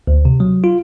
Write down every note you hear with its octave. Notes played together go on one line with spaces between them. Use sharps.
D2
C3
F#3
F4